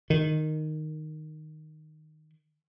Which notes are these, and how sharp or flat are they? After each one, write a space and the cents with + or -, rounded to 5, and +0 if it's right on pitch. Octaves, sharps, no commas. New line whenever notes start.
D#3 -10